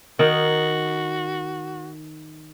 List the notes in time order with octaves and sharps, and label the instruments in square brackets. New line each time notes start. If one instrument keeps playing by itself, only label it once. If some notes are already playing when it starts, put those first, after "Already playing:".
[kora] D#3 D#4 [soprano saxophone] F#4